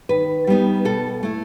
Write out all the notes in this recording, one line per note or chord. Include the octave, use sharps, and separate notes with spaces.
D#3 B4
G3 B3 D#4
B2 A4
A3 E4